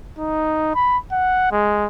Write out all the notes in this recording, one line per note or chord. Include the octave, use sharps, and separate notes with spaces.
D#4
B5
F#5
G#3